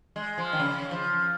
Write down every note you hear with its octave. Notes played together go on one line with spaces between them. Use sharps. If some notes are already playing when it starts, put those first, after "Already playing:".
G#3
F3
D#3
C#3
F3